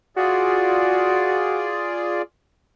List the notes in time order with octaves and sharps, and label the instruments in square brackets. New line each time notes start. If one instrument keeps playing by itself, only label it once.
[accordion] F4 G#4 D5 [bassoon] F#4